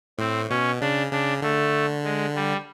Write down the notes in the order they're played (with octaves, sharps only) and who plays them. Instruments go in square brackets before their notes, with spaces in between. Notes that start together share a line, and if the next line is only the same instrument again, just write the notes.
[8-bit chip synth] A2 [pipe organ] C4
[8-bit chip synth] B2 [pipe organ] C#4
[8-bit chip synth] C#3 [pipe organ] D4
[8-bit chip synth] C#3 [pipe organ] D4
[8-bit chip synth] D3 [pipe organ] A3
[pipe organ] G#3
G3